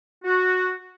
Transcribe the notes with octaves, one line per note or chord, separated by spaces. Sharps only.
F#4